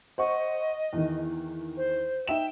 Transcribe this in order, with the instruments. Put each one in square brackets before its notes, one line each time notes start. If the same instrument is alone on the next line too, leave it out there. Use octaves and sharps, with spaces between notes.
[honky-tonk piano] C5 F#5 C#6 [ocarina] D#5
[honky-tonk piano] E2 D#3
[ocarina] C5
[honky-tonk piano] D#4 E5 E7 [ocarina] G5